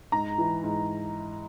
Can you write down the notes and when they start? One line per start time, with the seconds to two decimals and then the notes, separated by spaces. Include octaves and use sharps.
0.12 G#2 A#5
0.38 E3
0.63 G#2